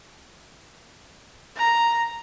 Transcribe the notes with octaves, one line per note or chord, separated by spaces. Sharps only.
A#5